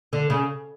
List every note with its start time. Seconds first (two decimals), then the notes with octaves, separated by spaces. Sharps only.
0.13 D3
0.30 C#3